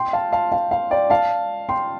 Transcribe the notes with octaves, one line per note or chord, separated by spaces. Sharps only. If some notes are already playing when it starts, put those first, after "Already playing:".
Already playing: G5 C6
F5 A5
F5 A5
F5
F5
D5 G5
F5 A5
G5 C6